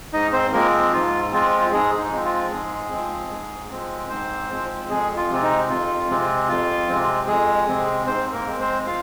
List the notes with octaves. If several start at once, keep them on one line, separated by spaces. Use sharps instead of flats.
G#2 D#4 D#5
C4 C5
F3 G#3 A#3 C4 A#4
G#2 F4
F3 G#3 C4 F4
G#2 G#3 G#4
D#4
F3 G#3 C4
F4
G#2 G#3 G#4
F3 G#3 C4
G#2
F3 G#3 C4
G#2 C4 C5
F3 G#3 C4
F2 G#3 G#4
F4
C3 G#3 C4
D#4
F2 F4
C3 G#3 C4
F2 F4
C3 G#3 C4
F2 G#3 G#4
C3 G#3 C4
G#2 C4 C5
A#3 A#4
G#3 C4
C4 C5
F4 F5